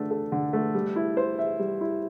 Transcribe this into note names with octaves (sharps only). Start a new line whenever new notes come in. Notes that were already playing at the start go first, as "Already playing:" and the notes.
Already playing: D3 A3 D4
A4
D3
A3
G3
E4
C5
E5
G3
E4